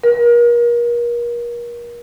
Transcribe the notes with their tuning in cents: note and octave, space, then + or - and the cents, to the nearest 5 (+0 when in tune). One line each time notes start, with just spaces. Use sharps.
A#4 +35